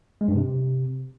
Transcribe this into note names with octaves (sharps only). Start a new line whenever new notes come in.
G#3
G2
C3